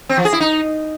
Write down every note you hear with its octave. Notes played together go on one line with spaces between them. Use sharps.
C4
F3
G#4
E4
D#4